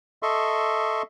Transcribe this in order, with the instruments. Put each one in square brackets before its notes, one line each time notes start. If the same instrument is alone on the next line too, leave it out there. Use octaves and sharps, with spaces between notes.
[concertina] A4 D#5 E5 C6 C#6